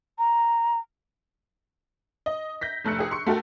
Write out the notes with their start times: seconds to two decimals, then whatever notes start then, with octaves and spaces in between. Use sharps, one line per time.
0.18 A#5
2.26 D#5
2.61 G6 A#6 B6
2.85 F1 A3 E6 F#6 C#7
2.99 G4 G#4
3.11 C6 C#6 C#7
3.26 A3 F#4 A4 A#4 G5